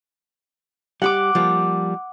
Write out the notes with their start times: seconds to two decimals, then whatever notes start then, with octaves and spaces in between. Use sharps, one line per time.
1.02 G3 G4 F#5 D6
1.35 F3 G3 A#3